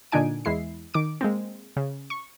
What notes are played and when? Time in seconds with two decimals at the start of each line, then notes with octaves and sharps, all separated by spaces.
0.12 A#2 D3 D4 D#4 G#5 D7
0.45 E2 G#3 E4 C7
0.94 D#3 D6 D7
1.21 G#3 A#3 C4
1.77 C#3
2.10 C#6